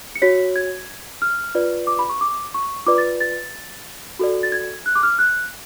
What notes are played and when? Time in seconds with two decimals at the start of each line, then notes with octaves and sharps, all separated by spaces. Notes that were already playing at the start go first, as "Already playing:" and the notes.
0.15 C#7
0.22 F#4 C#5 B6
0.56 G#6
1.22 F6
1.55 F4 B4 D5
1.87 D6
1.99 B5
2.09 C#6
2.21 D6
2.54 C#6
2.86 F4 B4 D5 D6
2.98 A6
3.20 A6
4.19 F#4 A4 D5
4.43 A6
4.52 G#6
4.86 F#6
4.95 D6
5.03 F6
5.19 F#6